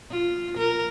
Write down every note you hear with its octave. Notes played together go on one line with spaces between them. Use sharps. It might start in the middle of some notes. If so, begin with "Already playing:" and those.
F4
A#4